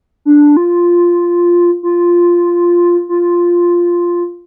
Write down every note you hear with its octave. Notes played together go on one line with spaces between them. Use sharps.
D4
F4
F4
F4